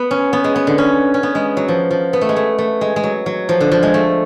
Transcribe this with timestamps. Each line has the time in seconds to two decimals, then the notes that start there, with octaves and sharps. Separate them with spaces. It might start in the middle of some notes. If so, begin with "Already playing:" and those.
Already playing: B3
0.11 C#4
0.33 B3
0.44 G#3
0.56 B3
0.67 D3
0.78 C#4
1.14 C#4
1.23 B3
1.35 G#3
1.57 F#3
1.68 F3
1.91 F3
2.13 B3
2.21 A3
2.29 G#3
2.36 A3
2.58 A3
2.81 G#3
2.96 G#3
3.04 F#3
3.26 F#3
3.49 F3
3.61 D3
3.71 F3
3.83 G#3
3.94 A3